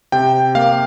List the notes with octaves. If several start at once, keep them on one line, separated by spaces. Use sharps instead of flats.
C3 G5
A#3 F5